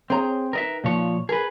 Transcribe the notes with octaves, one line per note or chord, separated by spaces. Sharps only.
C4 G#4 C#5 A#5
D#3 A#4 B4 D#5 E5
A#2 F3 C#5
G#4 A#4 B4